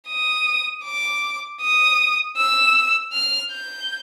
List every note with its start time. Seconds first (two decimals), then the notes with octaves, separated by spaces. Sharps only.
0.09 D#6
0.85 D6
1.61 D#6
2.37 E6
3.13 F6
3.51 G6